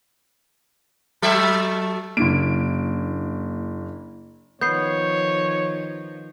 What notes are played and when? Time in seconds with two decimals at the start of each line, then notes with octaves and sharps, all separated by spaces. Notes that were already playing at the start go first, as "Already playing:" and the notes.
1.22 F#3 A3 E5
2.17 F#1 A#3 D4 E4 D7
4.61 D#3 F3 B3 C#5 G6 C7